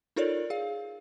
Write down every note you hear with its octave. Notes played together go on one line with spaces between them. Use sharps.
D#4 F4 A4 A#4 C#5 D5
G#4 F5